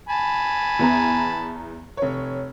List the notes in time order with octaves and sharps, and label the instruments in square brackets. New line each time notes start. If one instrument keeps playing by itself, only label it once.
[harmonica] G#5 A5 B5
[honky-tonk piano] E2 B3 A#5
F1 C#5